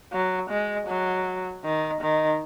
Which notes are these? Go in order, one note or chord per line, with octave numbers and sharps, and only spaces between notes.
F#3
G#3
F#3
D#3
D#3